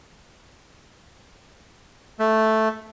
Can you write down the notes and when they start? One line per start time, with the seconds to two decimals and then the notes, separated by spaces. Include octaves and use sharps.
2.19 A3